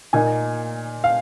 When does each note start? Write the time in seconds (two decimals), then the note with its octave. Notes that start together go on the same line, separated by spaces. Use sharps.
0.13 A#2 A#3 D#4 G#5
1.04 F5